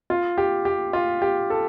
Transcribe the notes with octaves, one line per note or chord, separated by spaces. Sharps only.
F4
G4
G4
F4
G4
A4